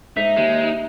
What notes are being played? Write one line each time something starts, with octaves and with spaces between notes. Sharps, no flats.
G#2 D#4 E5
D#2 G#3